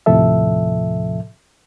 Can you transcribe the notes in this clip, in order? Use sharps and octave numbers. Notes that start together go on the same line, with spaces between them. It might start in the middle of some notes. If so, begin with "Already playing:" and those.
D#2 A2 C3 F3 A4 E5